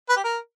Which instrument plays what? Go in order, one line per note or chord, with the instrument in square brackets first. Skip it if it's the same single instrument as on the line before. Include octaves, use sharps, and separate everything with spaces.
[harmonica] B4
G4
A#4